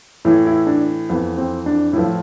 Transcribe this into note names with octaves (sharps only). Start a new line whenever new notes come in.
A2 E3 E4
E4
D4
F2 E3 B3
C4
D4
A2 F3 E4